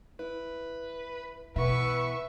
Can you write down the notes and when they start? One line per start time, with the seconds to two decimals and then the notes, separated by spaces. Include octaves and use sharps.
0.19 E4 B4
1.56 B2 E3 B3 E4 B4 E5 C#6